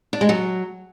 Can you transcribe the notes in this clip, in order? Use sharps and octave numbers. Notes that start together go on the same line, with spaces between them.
D4
G#3
F#3